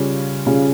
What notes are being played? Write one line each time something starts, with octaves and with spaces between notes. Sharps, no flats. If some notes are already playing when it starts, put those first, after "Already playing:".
Already playing: C#3 G3 C#4 F4
C#3 G3 C#4 F4